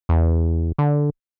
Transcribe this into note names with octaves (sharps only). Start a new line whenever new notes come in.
E2
D3